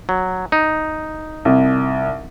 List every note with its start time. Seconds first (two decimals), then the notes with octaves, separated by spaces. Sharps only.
0.09 F#3
0.52 D#4
1.45 C2